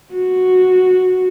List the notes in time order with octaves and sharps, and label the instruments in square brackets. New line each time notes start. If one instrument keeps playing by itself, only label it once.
[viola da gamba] F#4